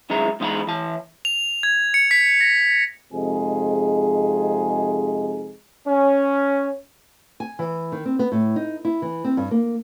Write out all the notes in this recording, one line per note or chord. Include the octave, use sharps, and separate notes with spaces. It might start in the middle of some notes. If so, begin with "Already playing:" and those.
F#2 D#3 G#3 E4 A#5
E2 G#3 D#4 F5 A#5 B5
E3 A5
F7
G#6
C#7
B6
A#6
F2 C3 G#3 D#4 G#4
C#4
G#5
E3
D#3
C4
B3
A2
D#4
E4
E3
C4
G2
A#3